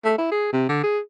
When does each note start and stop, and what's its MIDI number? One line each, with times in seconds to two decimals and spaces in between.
0.05 0.17 57
0.18 0.30 64
0.31 0.50 68
0.53 0.68 48
0.69 0.81 50
0.83 0.99 68